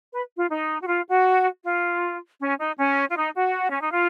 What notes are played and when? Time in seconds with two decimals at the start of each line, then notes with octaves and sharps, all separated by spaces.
0.12 B4
0.37 F4
0.50 D#4
0.82 F#4
0.87 F4
1.07 F#4
1.63 F4
2.40 C#4
2.58 D#4
2.78 C#4
3.09 F4
3.16 D#4
3.35 F#4
3.71 C#4
3.81 D#4
3.91 F4